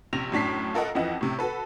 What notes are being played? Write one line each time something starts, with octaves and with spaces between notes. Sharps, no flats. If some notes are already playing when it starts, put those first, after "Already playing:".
A#1 C3 A#6 F7
F#2 A2 D4 B6 C7
F4 A4 A#4 D#5 F#5
F2 E3 F3 E4 D#5 F#5
A2 C3
F#4 A4 B4